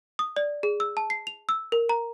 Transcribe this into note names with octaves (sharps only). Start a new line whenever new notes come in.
D#6
D5
G#4
E6
A5
C7
F7
E6
A#4
A#5